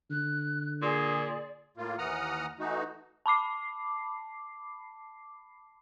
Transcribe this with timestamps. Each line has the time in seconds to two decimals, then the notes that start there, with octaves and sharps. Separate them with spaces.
0.11 D3 F#6
0.82 A#2 G#4 D5
1.77 A2 A#3 F4
1.98 D#2 E3 F#5 A#5 D#6 F6
2.60 E3 A3 D#4 F#4
3.26 A5 B5 D6 C7